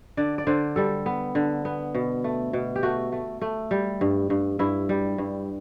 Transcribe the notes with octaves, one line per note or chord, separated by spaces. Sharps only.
D3 D5
D5
D3 C5
G3 A4
B3
D3
B3
B2
A3
B2
G4
A3 F#4
A3
A3
G3
G2
G2
G2 E4
G3
G2